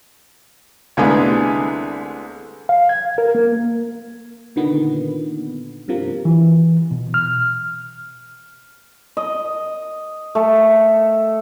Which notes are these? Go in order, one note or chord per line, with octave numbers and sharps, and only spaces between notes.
C2 D3 G#3 A3 B3 G#4
F5
G#6
A#4
A#3
A#2 D3 D#3 B3
G2 C3 F3 A#3
E3
B2
F6
D#5
A3